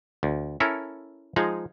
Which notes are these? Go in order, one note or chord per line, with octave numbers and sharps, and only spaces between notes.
D2
C#4 E4 A4 A#4
F3 G#3 D#4 G#4